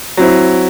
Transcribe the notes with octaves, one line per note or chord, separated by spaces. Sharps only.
F#3 C4 E4